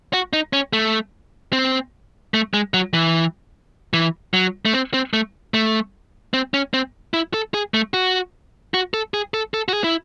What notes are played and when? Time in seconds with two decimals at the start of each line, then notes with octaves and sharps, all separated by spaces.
0.13 F#4
0.33 D#4
0.53 C#4
0.73 A3
1.53 C4
2.34 A3
2.54 G#3
2.74 F#3
2.94 E3
3.93 E3
4.34 F#3
4.65 A3
4.73 C4
4.94 C4
5.13 A3
5.54 A3
6.34 C4
6.54 C#4
6.74 C4
7.14 E4
7.34 A4
7.54 G#4
7.74 A3
7.94 F#4
8.74 F#4
8.94 A4
9.14 G#4
9.34 A4
9.54 A4
9.68 F#4
9.74 G#4
9.84 E4